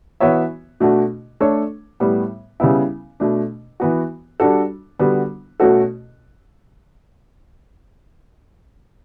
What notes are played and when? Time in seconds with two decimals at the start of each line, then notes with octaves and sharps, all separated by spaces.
0.20 E3 B3 F#4 C#5 E5
0.80 B2 A3 D4 F#4
1.40 A3 D4 A4 C#5
2.00 A2 G3 B3
2.60 C#3 G3 B3 E4
3.20 B2 A3 D4
3.80 E3 B3 F#4
4.40 G3 D4 F#4 A4
4.99 D3 G3 B3 F#4
5.60 B2 A3 C#4 F#4 A4